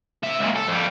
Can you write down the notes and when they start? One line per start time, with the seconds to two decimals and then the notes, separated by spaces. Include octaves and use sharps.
0.23 C3 E5
0.39 C#2 A#2
0.56 A4
0.67 F2 G3